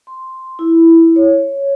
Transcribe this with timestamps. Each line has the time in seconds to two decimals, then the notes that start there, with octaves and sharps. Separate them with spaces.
0.07 C6
0.59 E4
1.16 C#5